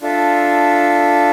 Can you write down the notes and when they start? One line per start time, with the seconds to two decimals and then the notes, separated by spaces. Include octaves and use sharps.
0.02 D4 F4 A4 E5